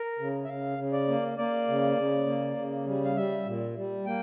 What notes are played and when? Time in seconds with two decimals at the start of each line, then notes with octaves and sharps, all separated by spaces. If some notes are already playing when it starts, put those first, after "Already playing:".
Already playing: A#4
0.19 C#3
0.44 E5
0.48 C#3 F5
0.78 C#3
0.92 D5
1.08 A#3
1.38 A#3 D5
1.68 C#3
1.97 C#3
2.27 A#3
2.57 C#3
2.87 G3
3.05 F5
3.16 G3 E5
3.46 A#2
3.77 G3
4.06 A#3 G5